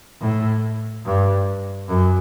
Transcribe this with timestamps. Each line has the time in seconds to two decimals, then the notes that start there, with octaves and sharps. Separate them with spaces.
0.21 A2
1.06 G2
1.89 F#2